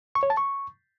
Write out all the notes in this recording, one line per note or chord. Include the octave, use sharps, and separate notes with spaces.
C#6
C#5
A5
C#6